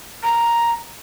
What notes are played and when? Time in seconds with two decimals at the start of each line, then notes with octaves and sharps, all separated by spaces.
0.23 A#5